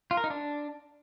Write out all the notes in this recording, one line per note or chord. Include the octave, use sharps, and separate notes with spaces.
F4
A#4
D#4
D4